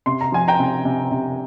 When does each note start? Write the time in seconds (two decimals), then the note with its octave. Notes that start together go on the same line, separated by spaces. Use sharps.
0.06 C3 C6
0.21 A#5
0.32 F3 G#5
0.48 G5 A#5
0.59 C3
0.85 C3
1.11 C3